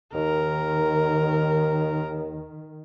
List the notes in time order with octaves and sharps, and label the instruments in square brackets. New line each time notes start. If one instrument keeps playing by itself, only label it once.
[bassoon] D#2 [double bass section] D#3 [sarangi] A#4